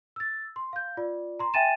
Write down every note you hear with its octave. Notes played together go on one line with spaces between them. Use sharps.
E6 A6
C6
F5 G6
F4 D5
A#5 C6
E5 G5 G#5 A6 D#7 E7